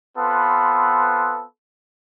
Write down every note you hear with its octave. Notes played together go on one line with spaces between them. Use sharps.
B3 C4 F4 A4 B4